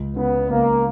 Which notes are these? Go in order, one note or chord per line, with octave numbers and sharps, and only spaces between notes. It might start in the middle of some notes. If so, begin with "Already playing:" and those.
Already playing: C#2
C#3 B3
C#2 A#3